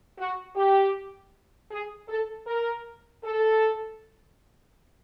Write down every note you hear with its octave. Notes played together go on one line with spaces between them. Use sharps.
F#4
G4
G#4
A4
A#4
A4